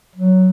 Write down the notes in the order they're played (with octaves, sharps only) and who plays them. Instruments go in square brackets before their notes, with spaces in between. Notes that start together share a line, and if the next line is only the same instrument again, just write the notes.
[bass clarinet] F#3